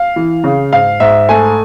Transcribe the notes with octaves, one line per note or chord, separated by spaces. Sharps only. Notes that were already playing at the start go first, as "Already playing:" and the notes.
Already playing: F5
E3
C#3
G#2 F5
G#2 E5
A3 G#5